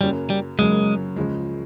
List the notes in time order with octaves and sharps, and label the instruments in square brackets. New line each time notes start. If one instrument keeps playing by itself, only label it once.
[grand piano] F#2 C#3 F#3 A#3 C#4 [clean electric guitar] G3
[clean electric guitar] G3
[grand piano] F#2 C#3 F#3 A#3 C#4 [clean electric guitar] G#3
[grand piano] C#2 C#3 F3 G#3